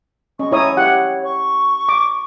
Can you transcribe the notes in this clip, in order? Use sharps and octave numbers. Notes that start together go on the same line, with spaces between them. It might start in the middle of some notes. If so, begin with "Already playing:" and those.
C#4 D#5 C#6
E4 C#5 A#5 D#6
E4 G4 C#5 F#5
C#6
D6